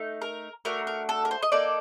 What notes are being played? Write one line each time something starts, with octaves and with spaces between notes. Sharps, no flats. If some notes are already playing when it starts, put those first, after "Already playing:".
Already playing: A3 D#4
A#4
A3 D4 F#4 A#4
A#4
A4
A#4
C5
D#5
A#3 D#4 A4 D5